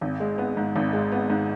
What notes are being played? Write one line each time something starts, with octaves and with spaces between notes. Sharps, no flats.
G#1
G#3
B3
G#2
G#1
G#3
B3
G#2